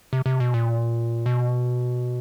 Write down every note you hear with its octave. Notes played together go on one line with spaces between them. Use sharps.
C3
C3
B2
A#2
B2